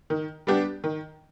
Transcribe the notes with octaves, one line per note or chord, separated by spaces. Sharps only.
D#3
G3 B3 D4 G4
D#3